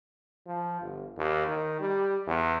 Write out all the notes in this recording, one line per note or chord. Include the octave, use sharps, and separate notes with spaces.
F3
G1
D#2
D#3
G3
E2